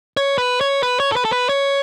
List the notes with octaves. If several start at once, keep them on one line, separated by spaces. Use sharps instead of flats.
C#5
B4
C#5
B4
C#5
A4
B4
A4
B4
C#5